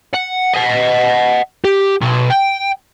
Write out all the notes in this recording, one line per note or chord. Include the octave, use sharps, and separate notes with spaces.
F#5
D#5 F#5
G4
B2 C6
G5